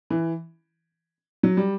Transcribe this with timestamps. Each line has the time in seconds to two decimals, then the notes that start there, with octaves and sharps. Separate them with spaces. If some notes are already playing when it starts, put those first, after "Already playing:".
0.10 E3
1.43 F#3
1.57 G3